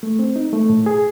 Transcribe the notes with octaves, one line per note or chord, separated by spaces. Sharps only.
A3
C4
D#4
A3
A2
G#4